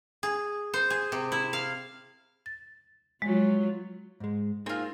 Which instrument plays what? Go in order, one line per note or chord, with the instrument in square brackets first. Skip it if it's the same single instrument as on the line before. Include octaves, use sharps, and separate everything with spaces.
[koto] G#4
C5
G#4
C3
E4
F5
[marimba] A6
[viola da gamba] F#3 F4 [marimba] G#3
[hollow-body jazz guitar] G#2 G#3
[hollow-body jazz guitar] A#3 G#4 [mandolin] C4 F4 [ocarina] D#4